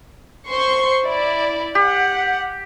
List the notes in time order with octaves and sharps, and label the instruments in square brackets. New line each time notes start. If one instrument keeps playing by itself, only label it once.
[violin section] C5 C6 C#6
E4 D5
[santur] G4 [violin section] F#5